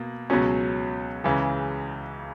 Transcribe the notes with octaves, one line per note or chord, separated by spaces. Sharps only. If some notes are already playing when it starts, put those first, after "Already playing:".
Already playing: B2 A#3
C#2 B2 F#3 C#4
C#2 C#3 E3